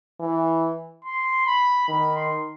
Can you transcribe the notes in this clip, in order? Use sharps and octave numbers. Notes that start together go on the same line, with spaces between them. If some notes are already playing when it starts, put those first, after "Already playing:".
E3
C6
B5
D#3 B5
C6